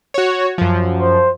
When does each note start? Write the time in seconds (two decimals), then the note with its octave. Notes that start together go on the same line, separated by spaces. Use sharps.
0.14 F#4 C#5
0.58 F#2 F3
1.00 C5